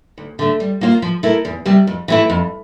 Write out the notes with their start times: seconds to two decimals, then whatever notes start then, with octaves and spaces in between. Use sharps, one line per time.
0.18 D2
0.39 D3 A3
0.60 G3
0.81 A#3 F4 C5
1.02 F3
1.23 A3 E4 A#4
1.45 E2
1.66 C3 G3
1.87 F2
2.08 E3 A3 E4
2.30 F2